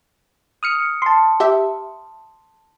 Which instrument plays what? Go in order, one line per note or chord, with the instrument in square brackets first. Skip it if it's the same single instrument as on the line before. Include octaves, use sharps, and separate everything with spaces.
[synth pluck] D#6 F6 C#7
A5 C6
[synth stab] G4 E5